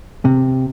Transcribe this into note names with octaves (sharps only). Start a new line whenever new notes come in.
C3